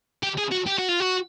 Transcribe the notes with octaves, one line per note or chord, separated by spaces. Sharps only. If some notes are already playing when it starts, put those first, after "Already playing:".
G4
G#4
F#4
G4
F#4
F4
F#4